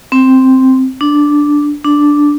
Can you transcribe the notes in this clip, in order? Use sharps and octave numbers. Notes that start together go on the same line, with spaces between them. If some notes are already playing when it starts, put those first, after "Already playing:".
C4
D4
D4